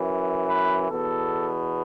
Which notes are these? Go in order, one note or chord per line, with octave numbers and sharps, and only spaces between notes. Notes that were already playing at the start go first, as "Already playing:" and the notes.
Already playing: F#2 E3
B4
E2 B2 A4